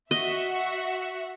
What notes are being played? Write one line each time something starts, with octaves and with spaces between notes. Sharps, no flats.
F#4 D#5 E5